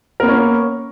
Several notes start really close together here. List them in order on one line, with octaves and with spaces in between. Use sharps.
A#4 B3 A#3 C#4